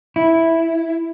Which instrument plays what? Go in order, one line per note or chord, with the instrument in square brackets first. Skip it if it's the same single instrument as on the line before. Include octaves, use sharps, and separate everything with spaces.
[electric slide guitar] E4